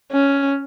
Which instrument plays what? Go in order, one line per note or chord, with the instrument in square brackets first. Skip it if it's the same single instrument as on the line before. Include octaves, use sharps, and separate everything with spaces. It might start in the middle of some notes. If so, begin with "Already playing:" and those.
[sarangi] C#4